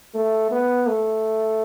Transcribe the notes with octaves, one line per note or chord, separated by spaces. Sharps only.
A3
B3
A3